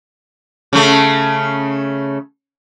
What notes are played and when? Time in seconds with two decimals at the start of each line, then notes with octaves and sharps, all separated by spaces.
0.73 C#3 A3